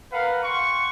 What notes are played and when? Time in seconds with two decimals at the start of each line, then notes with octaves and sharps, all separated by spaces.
0.11 A#4 B4 F5 F#5
0.43 F#5 G5 C6 C#6